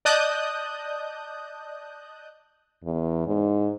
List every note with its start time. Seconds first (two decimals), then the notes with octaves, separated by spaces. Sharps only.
0.05 D5 D#5 A5 D#6 F#6 G6
2.84 E2
3.27 G#2